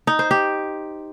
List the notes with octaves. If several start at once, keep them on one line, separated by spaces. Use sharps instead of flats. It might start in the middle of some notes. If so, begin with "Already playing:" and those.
D#4
C5
G4